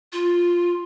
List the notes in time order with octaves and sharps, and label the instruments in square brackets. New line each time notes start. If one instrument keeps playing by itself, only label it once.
[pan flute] F4